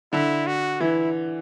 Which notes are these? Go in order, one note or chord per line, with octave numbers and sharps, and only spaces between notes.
D3 E4
F#4
E3 E4